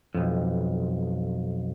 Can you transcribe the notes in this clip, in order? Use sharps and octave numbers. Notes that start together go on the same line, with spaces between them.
B1 F2